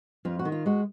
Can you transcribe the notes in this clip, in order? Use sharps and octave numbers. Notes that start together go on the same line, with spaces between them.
F2 F4
F#4
D#3
F4
G#3 F#4